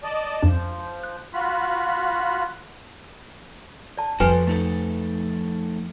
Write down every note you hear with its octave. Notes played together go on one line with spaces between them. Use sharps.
D5 D#5 A5
F2 F3 D4 E7
F#6
F4 F#4 B5
D5 A5
F2 F3 F#4 A4 B4 C5 G5 G#5
A3 D#4 A4